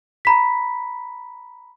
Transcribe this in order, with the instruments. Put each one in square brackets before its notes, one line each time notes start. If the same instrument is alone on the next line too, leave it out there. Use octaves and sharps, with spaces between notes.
[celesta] A#5 B5 B6